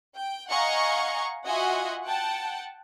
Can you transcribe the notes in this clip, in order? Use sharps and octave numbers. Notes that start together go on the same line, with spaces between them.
G5
D#5 F5 F#5 G#5 A#5 C#6
F4 F#4 D#5 E5 F#5 G#5
F#5 G5 A5